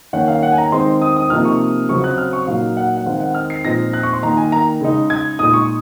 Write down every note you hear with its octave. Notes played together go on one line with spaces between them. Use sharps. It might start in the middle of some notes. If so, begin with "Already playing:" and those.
D#3 A#3 C#4 F#5
F5
F#5
G#5
A#5
D#3 G#3 C4 D#4 C6
D#6
D#6
C3 F3 A#3 D#4 F6
C#6
C#3 F#3 C4 C#6
F#6
F6
C#6
A#2 F#3 A#3 D#4 F5
F#5
F#5
D#3 G#3 C4 F5
F#5
F6
C7
A#2 F3 G#3 C4 D#4 A#6
F#6
C#6
C6
D#3 A#3 D#4 A#5
G#5
A#5
C#3 G#3 D#4
G#6
A#2 G#3 D#4 D#6
C#6